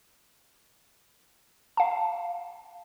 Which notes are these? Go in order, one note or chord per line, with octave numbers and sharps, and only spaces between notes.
F5 A5